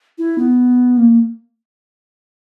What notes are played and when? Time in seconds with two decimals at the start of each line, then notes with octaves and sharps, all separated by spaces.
0.18 E4
0.38 B3
0.97 A#3